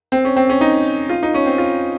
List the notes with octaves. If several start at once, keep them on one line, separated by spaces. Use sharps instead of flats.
C4
C#4
C4
C#4
D#4
F4
D#4
C#4
C4
F4